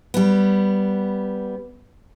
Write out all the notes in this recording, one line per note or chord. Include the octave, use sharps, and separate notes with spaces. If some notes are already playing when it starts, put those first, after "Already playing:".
G3 B3